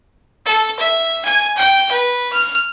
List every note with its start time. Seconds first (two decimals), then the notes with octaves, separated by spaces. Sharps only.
0.46 A4
0.80 E5
1.25 G#5
1.57 G5
1.92 B4
2.33 F6